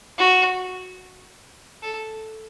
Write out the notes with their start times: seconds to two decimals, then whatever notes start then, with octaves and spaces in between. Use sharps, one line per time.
0.18 F#4
1.83 A4